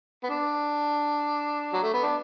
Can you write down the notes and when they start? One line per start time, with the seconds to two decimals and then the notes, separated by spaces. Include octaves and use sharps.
0.23 B3
0.30 D4
1.73 F#3
1.83 A3
1.94 B3
2.03 D4